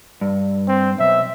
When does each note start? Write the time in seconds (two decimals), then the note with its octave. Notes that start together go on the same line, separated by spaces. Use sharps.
0.21 G2
0.68 C4
0.99 B1 E5